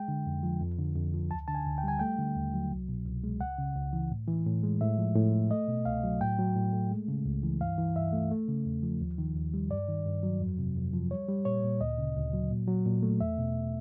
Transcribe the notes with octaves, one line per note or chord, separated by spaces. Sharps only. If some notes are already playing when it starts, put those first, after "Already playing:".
Already playing: G#3 G5
D3
F2
F3
F2
D3
F2
F3
D2 A5
D3 A5
G#5
D2
G5
G3 G#5
A3 G5
D3
D#2
F#3
C2
B2
C2
G#3
C#2 F#5
C#3
C#2
E3
A2
E3
A2
G#3
A2 E5
F3
A2
A3
A3 D#5
B2
C2 F5
F#3
A2 G5
F#3
A2
A3
G#3
C#3
C#2
E3
G2 F5
E3
G2 E5
A3
A3
C#3
E2
F3
D#2
D#3
D#2
G3
G2 D5
D#3
G2
F#3
F2
C3
F2
F3
G3 C#5
G3
A#2 C#5
A#2
D2 D#5
C#3
D2
F#3
A#2
F#3
A#2
A3
E2 E5
B2